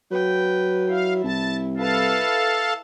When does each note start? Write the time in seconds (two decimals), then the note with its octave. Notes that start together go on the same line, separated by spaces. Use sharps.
0.11 F#3 B4 G5
0.89 E4 F5
1.24 C2 A5
1.77 E4 A4 B4 F5 A5